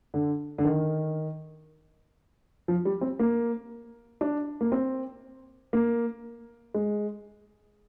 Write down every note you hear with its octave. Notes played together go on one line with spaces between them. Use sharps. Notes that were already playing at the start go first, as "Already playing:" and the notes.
D3
D3
D#3
F3
G3
C4
A#3
D4
A#3
C4
A#3
G#3